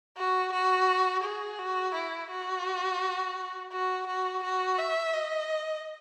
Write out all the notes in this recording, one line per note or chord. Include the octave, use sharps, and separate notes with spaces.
F#4
F#4
G#4
F#4
E4
F#4
F#4
F#4
F#4
E5
D#5